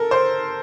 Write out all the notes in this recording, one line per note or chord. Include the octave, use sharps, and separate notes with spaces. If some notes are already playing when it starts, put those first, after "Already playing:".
Already playing: A4 A#4
C5